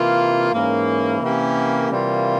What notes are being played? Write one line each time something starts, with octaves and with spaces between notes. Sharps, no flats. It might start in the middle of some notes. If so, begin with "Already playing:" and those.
Already playing: C3 E3 A#3 F4
G#2 E3 A#3 C#4
C3 E3 A#3 C#4 G4
C3 E3 G3 A#3 F4